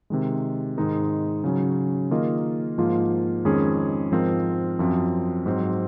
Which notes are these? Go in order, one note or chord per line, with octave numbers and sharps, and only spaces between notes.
C3 D#3 G#3
G#2 D#3 G#3 D#4 A#4
C#3 F#3 C#4
D#3 A#3 F4 G#4 D#5
G#2 F3 A#3 F4
F2 D#3 G#3 C#4 G#4
G#2 F3 C4 F4 A#4
F#2 F3 C4
G#2 F#3 C4